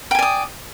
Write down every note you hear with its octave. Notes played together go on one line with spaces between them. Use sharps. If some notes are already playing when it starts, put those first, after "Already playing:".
D5 G5 G#5 D#6